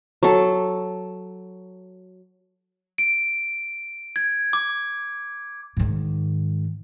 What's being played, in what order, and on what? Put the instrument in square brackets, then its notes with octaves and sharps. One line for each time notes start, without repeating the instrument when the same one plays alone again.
[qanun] F#3 A4
[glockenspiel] D7
G#6
D6
[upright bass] G#2 D#3